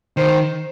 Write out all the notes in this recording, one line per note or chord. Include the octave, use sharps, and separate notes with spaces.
D#3 C5